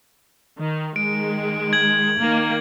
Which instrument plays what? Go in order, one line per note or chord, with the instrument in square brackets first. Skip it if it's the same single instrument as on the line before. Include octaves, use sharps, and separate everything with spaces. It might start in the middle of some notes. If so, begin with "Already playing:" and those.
[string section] D#3
[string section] D#3 G#3 [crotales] D7
[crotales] G#6 F#7
[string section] D#3 A#3